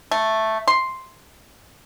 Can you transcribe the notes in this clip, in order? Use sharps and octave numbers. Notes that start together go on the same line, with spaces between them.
A3
C6